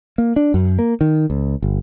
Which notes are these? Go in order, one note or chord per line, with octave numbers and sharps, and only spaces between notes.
A#3
D4
F#2
A#3
D#3
C#2
G1